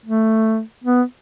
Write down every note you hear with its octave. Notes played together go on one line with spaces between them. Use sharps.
A3
B3